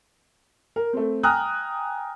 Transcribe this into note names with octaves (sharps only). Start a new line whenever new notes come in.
A#4
A3 C4
G5 G#5 A#5 D#6 F6 F#6